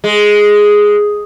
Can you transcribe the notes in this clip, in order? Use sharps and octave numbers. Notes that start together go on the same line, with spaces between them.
G#3